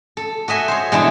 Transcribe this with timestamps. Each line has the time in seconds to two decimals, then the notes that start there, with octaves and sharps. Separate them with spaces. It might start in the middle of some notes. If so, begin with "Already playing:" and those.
0.17 A4
0.48 F#4 D#5 E5 G#5
0.68 C5 C#5
0.92 B2 E3 G#3 D4 E4